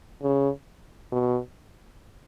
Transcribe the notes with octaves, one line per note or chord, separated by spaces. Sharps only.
C#3
B2